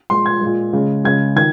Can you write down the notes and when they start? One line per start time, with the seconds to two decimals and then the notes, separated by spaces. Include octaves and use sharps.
0.10 A#2 G#3 C6
0.26 G#6
0.41 A#2 G#3
0.73 C#3 G#3
1.04 C#3 G#3 G#6
1.36 D#3 G#6